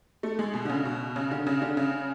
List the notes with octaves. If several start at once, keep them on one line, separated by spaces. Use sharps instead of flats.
A3
G#3
B2
D3
C#3
B2
C#3
D3
C#3
D3
C#3